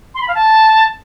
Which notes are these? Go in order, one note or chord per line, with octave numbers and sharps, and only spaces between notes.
C6
B5
F5
A5